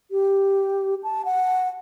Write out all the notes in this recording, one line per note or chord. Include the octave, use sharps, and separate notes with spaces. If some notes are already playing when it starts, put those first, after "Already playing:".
G4
A5
F#5